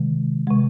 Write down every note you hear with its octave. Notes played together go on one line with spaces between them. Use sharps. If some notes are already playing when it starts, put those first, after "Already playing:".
Already playing: C3 D#3 G#3
C3 G#3